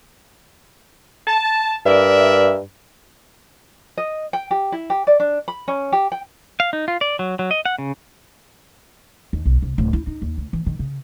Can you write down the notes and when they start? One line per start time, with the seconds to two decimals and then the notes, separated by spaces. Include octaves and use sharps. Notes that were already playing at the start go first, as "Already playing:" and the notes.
1.27 A5
1.86 G2 A#4 D5 E5
3.98 D#5
4.33 G5
4.51 G4
4.72 E4
4.90 G4
5.07 D5
5.20 D4
5.48 B5
5.68 C#4
5.93 G4
6.12 G5
6.60 F5
6.73 D#4
6.88 F4
7.01 D5
7.19 F#3
7.39 F#3
7.51 D#5
7.66 F#5
7.78 C#3
9.33 D#2
9.46 B1
9.62 C2
9.78 D1
9.93 E4
10.07 D#4
10.22 D#2
10.38 D2
10.53 E3
10.66 D#3
10.79 C#3